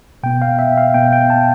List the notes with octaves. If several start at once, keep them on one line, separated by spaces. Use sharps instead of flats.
B2 B3 G5
F5
E5
F5
B2 B3 G5
G5
A5